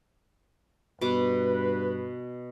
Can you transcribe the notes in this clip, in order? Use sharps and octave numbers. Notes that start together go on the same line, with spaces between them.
G2 B2 B4 D6